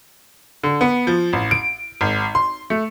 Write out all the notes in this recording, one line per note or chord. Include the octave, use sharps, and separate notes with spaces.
D3
B3
F3
A1
D7
G#1
C6
A3